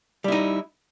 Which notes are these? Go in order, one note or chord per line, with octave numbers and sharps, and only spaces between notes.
G3 D#4 E4